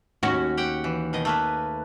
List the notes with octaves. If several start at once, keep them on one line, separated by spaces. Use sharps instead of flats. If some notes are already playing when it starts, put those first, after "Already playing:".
D#2 C#4 F#4
G4 F#5 G5
E3
B2 D#3 D#5
A3 A#3 B4